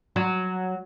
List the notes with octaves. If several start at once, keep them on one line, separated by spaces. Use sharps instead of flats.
F#3